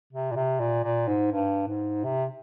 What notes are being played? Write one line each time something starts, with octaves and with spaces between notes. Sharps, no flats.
C3
A#2
C3
A#2
A#2
G#2
G2
G#2
C3